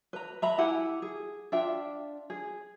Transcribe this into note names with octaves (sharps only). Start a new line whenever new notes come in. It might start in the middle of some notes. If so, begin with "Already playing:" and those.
B4 A#5
E5 A#5 B5
E4 G4 F#5 G#5
G#4
D4 F4 E5 G5
G#4